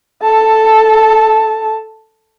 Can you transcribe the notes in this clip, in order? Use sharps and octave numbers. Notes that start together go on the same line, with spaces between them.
A4 A5